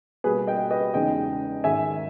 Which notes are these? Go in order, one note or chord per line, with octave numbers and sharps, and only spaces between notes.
B2 G3 A#3 G#4 B4
D#5 G5
B4 D#5
E2 C#3 G#3 D#4 D#5 G5
G#2 D#3 G#3 E5 G#5